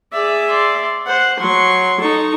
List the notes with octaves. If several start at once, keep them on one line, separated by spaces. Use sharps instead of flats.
G#4 D5 E5
D5 C6
C5 F#5
F#3 C6 C#6
D#4 A4 C#6